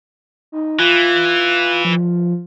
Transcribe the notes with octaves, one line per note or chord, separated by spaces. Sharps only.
D#4
E3 F4
F3